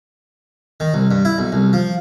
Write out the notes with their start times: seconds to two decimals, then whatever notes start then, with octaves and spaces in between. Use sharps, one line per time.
0.80 D#3
0.94 C2
1.11 G2
1.25 E4
1.38 B1
1.52 C2
1.73 F3